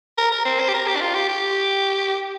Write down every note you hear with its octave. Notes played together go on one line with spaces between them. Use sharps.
A#4
A#4
C4
C5
G4
A#4
G4
D4
F4
G4
G4